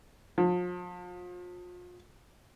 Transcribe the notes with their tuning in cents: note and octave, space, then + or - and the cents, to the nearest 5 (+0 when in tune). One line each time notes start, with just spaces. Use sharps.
F3 +40